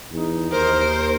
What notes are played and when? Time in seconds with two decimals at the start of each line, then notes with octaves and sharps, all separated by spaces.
0.11 E2 D#4
0.52 D#2 A#4 C5